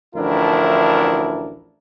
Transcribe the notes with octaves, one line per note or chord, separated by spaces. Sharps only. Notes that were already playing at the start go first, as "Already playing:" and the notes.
A1 D2 F3 D4 E4 A#4